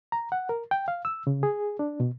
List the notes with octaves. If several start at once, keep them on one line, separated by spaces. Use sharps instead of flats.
A#5
F#5
A#4
G5
F5
E6
C#3
G#4
D4
B2